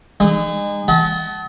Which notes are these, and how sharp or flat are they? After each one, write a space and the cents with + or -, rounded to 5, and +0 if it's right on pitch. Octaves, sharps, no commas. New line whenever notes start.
G#3 -35 D#4 -40
D#5 +45 F#5 +35 A5 -20